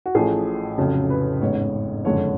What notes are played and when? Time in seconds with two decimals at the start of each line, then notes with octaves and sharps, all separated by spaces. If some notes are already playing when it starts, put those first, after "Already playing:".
0.06 F#4
0.14 A1 A2 F3 A3 G#4
0.77 F1 F2 C#3 F#3 A4
1.10 B4
1.41 A1 G#2 G#3 B3 C#5
2.05 F#1 F2 D3 G#3 C#5